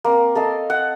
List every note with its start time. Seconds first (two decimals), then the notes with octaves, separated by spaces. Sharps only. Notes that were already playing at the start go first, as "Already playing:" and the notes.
0.04 A#3 C4
0.35 A4 D#5 F5
0.70 F#5